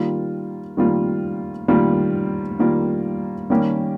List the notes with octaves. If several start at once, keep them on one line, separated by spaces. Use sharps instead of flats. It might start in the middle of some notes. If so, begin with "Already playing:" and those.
Already playing: D#3 G3 A#3 F4
D#3 G3 A#3 F4
D#3 G3 A#3 F4
D#3 G3 A#3 F4
D#3 G3 A#3 C#4 G4